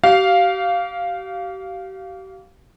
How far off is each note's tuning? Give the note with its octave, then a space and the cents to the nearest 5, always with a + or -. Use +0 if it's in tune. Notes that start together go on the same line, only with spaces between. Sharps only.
G4 -40 F5 +0